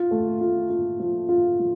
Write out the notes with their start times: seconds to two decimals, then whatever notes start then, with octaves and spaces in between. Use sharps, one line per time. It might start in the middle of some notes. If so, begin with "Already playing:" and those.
Already playing: F4
0.11 A3
0.41 F4
0.70 F4
1.00 F3
1.29 F4
1.59 F3